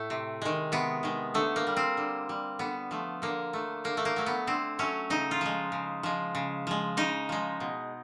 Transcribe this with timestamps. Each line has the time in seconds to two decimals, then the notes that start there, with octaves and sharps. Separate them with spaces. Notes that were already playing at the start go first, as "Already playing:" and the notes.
Already playing: A2 A3
0.10 C3
0.42 D#3 G#3
0.72 C3 B3
1.03 D#3 G#3
1.34 D3 A3
1.56 A#3
1.67 G3
1.77 C4
1.97 D3
2.29 G3
2.59 D3 B3
2.91 F3 A3
3.22 D3 A#3
3.53 F3 A3
3.84 D3 A#3
3.97 A3
4.05 A#3
4.16 F#3 A3
4.26 B3
4.47 D3 C4
4.79 F#3 A3 C#4
5.10 C#3 D#4
5.31 F4
5.41 F3 G#3
5.72 C#3
6.03 F3 G#3
6.35 C#3
6.67 F3 G#3
6.97 C#3 D#4
7.29 F3 G#3
7.60 B2